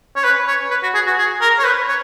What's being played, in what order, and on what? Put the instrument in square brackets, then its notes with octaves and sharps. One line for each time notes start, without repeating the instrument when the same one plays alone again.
[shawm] C#5
B4
C#5
B4
F#4
G#4
F#4
G#4
A#4
C#5
B4
C#5